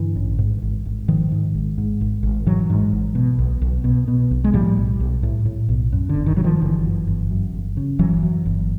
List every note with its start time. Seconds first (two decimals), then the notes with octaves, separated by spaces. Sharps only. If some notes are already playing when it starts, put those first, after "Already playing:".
Already playing: G2 D3 E3
0.16 A1
0.39 G#2
0.62 G#1
0.86 G#1
1.08 G#2 D#3 F3
1.32 G#2
1.54 G#1
1.78 G#2
2.01 G#1
2.23 G#1
2.46 G#2 E3 F#3
2.70 G#2
2.92 G#1
3.15 B2
3.39 B1
3.61 B1
3.84 B2
4.08 B2
4.31 B1
4.44 G#3
4.53 A2 F3 G3
4.77 B1
5.00 B1
5.23 A2
5.45 A2
5.69 B1
5.92 F#2
6.09 D3
6.15 G1
6.26 D#3
6.37 C#3 F#3
6.44 D#3 F3
6.61 G1 D3 E3
6.84 F#2
7.07 G1
7.31 F#2
7.53 G1
7.77 C#3
7.99 G1 E3 F#3
8.22 F#2
8.45 G1